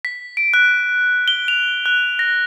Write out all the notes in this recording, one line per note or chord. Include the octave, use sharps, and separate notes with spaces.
B6
D7
F#6
G7
F7
F#6
A#6